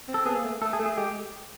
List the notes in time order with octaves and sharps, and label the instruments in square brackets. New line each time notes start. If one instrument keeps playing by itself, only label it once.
[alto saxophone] C4
[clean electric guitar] A4
[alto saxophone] B3 [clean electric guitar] G#4
[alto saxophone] A#3
A3
[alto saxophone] A3 [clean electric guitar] A4
[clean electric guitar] G#4
[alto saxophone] A3
[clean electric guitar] G#4
[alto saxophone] G#3 [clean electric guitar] G4